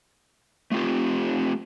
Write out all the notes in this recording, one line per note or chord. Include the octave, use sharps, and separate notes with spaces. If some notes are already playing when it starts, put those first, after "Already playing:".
A3 C4 F4 G4